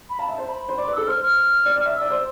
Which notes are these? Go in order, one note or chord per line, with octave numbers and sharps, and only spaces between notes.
B5
F5 A5
E5
C5
B5
C5
D5 D6
B4
A4 E6
C5 F6
F6
D5
D5
E5
E6
D5
C5